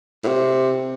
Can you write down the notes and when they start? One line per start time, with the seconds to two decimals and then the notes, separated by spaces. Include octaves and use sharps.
0.24 A2
0.28 C3